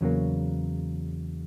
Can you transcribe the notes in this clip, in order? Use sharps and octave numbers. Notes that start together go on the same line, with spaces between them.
E2 C#3 F#3 A#3